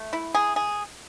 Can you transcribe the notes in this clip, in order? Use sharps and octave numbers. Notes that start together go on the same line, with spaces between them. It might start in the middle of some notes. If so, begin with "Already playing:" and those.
Already playing: A3
E4
G#4
G#4